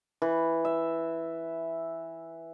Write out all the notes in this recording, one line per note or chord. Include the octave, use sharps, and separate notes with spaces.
E3
E5